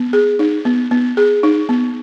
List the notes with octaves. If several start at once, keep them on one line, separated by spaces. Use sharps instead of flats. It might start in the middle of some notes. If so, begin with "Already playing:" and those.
Already playing: B3
G#4
D#4
B3
B3
G#4
D#4
B3